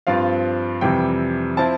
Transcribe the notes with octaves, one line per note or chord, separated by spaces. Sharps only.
G2 F3 C4 F4 F5
F2 C3 E3 G3 G5
F3 C4 E4 A5